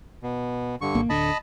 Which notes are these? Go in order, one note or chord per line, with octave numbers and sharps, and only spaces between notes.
B2
G2 D3 C#6
G#1 A#3
D1 D3 D#5 A5 B5